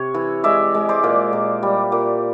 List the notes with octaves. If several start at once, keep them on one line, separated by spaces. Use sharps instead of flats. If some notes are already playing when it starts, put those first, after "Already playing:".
Already playing: C3 C#5
E3
G#3 D5 E5
G#3
C5 D5
A#2
A#2
G3
A#2